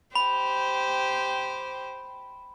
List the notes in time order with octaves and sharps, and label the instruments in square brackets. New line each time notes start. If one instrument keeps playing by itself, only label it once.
[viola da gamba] G4 C5 [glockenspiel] B5